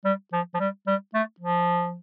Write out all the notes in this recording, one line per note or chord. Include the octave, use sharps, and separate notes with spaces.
G3
F3
F3
G3
G3
A3
F3